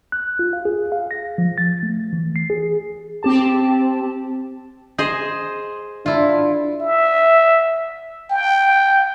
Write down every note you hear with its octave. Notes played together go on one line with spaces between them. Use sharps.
F#6
F4
F5
G#4
F5
A#6
F3
A6
A3
E3
C7
G#4
C4 G4 A5
G#4 C5 D#5
D4 E4 F4
E5
G5